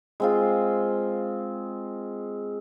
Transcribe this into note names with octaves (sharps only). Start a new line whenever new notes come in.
G#3 C4 F4